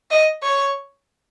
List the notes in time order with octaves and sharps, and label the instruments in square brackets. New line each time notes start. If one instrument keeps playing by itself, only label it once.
[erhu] D#5
C#5